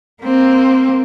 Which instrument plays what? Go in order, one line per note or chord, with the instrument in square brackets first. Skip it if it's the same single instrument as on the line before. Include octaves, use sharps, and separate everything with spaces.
[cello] A#3 C4